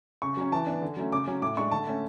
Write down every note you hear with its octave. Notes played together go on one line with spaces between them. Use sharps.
C#3 C#6
F#3 C#4
E3 A5
B3 D4
D3
F#3 A3 C#4
C#3 D6
F#3 C#4
A2 D6
G#3 D4 C#6
D3 A5
A3 C#4